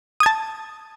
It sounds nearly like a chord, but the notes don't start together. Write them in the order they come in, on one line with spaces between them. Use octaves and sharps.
D#6 G#6 A5